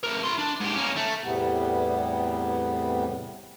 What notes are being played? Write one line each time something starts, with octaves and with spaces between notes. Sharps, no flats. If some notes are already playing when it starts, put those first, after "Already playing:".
A3 A#4
E4 C6
D4
G#2 G4
A#3 C#4
A3
E2 A2 C3 G3 B3